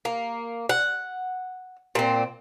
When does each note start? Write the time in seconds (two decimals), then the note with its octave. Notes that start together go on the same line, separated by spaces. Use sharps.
0.05 A#3
0.69 F#5
1.95 A#2 C4